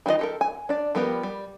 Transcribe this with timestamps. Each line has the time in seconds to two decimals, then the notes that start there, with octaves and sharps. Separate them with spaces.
0.06 D#3 E3 D4 F4 D#5
0.19 G4 A4 A#4
0.41 G#5
0.69 D4 D5
0.95 F3 G3 B3 G4 A#4
1.23 G3